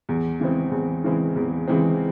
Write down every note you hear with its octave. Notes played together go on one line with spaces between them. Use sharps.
E2
C#3 E3 G#3 C4
E2
C#3 E3 G#3 C4
E2
C#3 E3 G#3 C4